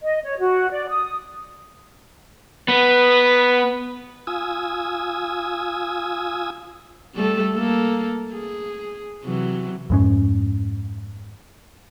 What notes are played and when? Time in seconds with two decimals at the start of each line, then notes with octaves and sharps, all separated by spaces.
0.03 D#5
0.25 C#5
0.39 F#4
0.71 D5
0.89 D#6
2.68 B3 B4
4.27 F4 G#5 D#6 E6
7.15 G3 A3 A4
7.55 A#3 A4
8.32 G#4
9.24 C3 E3 F#3
9.90 F2 G#2 C#4